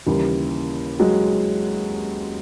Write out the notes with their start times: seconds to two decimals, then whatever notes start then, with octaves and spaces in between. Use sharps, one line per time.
0.06 D#2 C#3 E3 G3
0.99 F#3 G#3